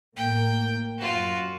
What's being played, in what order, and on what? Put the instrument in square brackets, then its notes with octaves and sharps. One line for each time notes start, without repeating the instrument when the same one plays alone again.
[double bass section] A1 A2 A#3 [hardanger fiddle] G5
[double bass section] F#2 [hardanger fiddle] F4 F#4